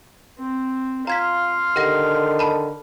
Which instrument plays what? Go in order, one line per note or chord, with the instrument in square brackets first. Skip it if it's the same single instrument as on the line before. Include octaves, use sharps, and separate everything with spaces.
[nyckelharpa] C4
[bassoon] F4 [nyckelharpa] F5 C6 [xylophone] A#5 G#6 B6
[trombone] D3 [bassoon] D#3 [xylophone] G4 F#5 A#6
[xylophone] A5 B5